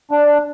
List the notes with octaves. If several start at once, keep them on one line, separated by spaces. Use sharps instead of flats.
D4